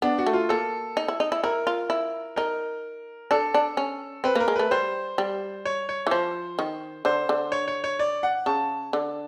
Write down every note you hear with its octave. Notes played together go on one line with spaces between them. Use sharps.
B3 D4
F#4
A3
F4
A#3 A4
D#4
E4
D#4
E4
E4 A#4
F4
E4
D#4 A#4
D4 A4
D4
C#4
C4 B4
A#3 A#4
G#3
A3 B4
G3 C5
G3
C#5
C#5
E3
F3 C5
D#3
D3 C5
D3
C#5
C#5
C#5
D5
F#5
C#3 A5
D3